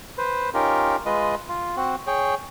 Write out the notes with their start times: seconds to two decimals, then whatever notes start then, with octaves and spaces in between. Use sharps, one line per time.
0.18 B4 C5
0.54 C#4 D#4 F4 G4 A#4
1.06 G#3 F4 B4 D#5
1.49 F4
1.77 C4 F#4
2.07 G#4 C#5 G5